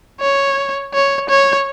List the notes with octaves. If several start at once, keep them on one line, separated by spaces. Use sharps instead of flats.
C#5
C#5
C#5